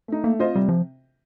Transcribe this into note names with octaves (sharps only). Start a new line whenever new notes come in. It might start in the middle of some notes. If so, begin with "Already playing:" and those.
A3 D#4
A3 A#3
C4 F4 C5 D#5
C3 G3
F3